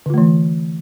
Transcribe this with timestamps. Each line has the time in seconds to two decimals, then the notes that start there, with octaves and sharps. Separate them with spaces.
0.06 D3
0.10 F4
0.14 A3
0.18 E3